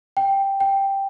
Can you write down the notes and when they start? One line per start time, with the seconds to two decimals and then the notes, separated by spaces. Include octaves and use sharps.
0.17 G5
0.60 G5